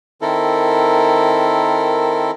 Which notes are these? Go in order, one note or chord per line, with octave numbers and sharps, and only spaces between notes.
D#3 C4 E4 A4 A#4